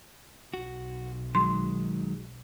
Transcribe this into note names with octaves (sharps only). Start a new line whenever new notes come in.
B1 F#4
D#3 F#3 G#3 C6